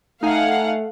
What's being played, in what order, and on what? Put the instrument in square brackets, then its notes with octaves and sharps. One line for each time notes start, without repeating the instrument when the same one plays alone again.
[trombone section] A3 [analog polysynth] D#4 G#5 [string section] F5 F#5